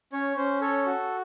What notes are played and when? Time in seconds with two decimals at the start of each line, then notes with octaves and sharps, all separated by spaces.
0.13 C#4 C#5
0.37 C#4 C5
0.61 A4 C#5
0.86 F#4